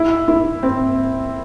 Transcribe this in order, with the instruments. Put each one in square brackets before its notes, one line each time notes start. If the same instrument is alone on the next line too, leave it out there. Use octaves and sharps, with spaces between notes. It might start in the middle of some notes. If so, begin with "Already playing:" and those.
Already playing: [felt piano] E4
E4
C4